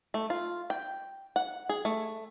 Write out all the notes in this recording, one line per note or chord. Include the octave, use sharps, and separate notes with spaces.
A3
F4
G5
F#5
G#4
A3